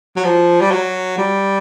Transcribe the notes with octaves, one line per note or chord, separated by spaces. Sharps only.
F#3
F3
G3
F#3
G3